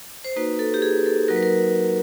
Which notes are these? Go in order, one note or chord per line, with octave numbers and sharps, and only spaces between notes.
C5
A#3 D#4 F#4 B4
A4
G4
G#4
A4
F#3 A#3 D#4 F#4 A#4
B4
A#4